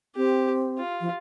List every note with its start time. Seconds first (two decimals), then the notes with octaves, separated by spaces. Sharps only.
0.16 C4 G4
0.78 F4
1.01 F3